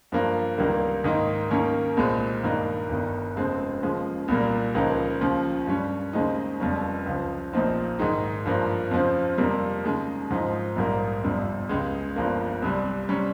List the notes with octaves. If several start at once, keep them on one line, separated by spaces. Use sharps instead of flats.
G2 F3 A#3
C#2 C3 D#3 G3 A#3
G#2 D#3 A#3 D#4
D#2 D#3 A#3 C#4
C2 A#2 G#3 C4
G2 D#3 A#3 D#4
G1 G2 D#3
F1 F2 C#3 G#3 C4
D#2 C#3 F3 G#3
C2 A#2 G3 A#3
C#2 C#3 F3 A#3 D#4
D#2 C#3 F3
G2 G3 C#4
D#2 C#3 G#3 C4 D#4
F1 F2 C#3 G3 C#4
C#2 C#3 F3
A#1 A#2 F3 C4 D#4
G#2 D#3 G#3 D#4
G2 F3 A#3
F2 C#3 F3 C4
F2 C3 G3 A#3
D#2 C#3 G#3 D#4
G#2 F3 C4 D#4
A#1 G#2 G3 A#3
G1 F2 C3 G3
C#2 C#3 G#3
G1 G2 F3 A#3
C2 C3 G3
C3 G3 C#4